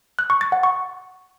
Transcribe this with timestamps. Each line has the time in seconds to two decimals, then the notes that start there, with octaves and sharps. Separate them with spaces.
0.19 F#6
0.30 C#6
0.41 A6
0.52 F#5
0.63 C#6